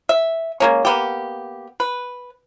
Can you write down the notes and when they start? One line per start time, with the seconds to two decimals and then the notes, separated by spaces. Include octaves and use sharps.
0.09 E5
0.60 G#3 A#3 C#4
0.85 A#3 B3 G4
1.80 B4